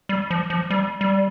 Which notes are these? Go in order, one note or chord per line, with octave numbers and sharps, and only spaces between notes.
G3
F3
F3
G3
G3